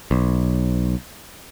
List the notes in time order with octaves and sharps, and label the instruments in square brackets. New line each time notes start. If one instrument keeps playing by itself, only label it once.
[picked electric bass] B1